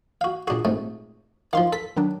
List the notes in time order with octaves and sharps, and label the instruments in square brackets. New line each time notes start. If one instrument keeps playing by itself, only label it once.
[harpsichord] F#4 F5
[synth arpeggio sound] A#2 G#4 [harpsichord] D4 F#4
[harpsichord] G#2 C3 A3
[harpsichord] D#3 F3 [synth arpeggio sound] F5 C6
[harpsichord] A4 [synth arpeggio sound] B6
[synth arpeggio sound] D#3 F#3 D4